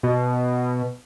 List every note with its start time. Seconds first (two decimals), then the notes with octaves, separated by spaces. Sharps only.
0.03 B2